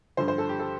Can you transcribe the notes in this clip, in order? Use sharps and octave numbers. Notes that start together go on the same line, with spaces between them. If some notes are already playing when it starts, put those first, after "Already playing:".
G2 D3 F3 C5
C5
A4
G4
A4